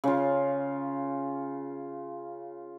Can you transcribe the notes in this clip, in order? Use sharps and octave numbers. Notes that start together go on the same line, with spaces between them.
C#3 F4